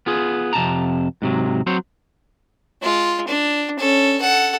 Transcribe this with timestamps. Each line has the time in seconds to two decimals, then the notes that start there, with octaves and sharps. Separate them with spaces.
0.06 B3 F4 G#4
0.53 F2 C3 A5 A#5
1.22 G#2 C3 F#3
1.67 F#3 C4 C5 C#5
2.82 G#3 F4
3.27 D4
3.78 C#4 A4
4.20 A4 F#5